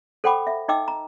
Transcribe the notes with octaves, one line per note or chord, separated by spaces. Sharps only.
A4 C5 F#5 G5 B5 D6
E5
D#4 D#5 G5 D6 E6
A#5